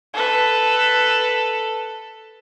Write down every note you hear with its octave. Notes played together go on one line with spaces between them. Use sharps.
A4 B4